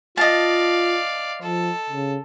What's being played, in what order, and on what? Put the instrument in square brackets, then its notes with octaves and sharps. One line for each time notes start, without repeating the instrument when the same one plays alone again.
[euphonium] F4 [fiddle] D5 F5 [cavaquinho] D#5 A5
[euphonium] F3 [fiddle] A4
[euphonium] C#3